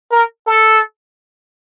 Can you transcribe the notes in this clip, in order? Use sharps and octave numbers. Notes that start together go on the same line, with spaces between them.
A#4
A4